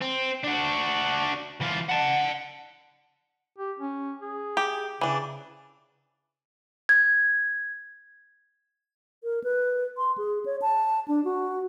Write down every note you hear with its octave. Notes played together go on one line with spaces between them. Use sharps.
C4
D4 F#4
E3 F4
F#5 A5
G4
C#4
G#4
G4
C#3 E3 D4
G#6
A#4
B4
C6
G#4
C#5
A5
D4
F#4